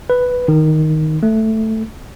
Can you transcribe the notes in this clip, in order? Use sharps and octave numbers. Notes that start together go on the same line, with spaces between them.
B4
D#3
A3